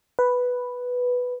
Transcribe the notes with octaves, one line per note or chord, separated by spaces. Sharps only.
B4